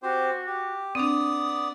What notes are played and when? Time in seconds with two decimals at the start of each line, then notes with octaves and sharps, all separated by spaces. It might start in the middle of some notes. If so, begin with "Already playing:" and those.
0.03 C4 F#4 G4 C5
0.47 G4
0.95 B3 C4 D4 D5 D#6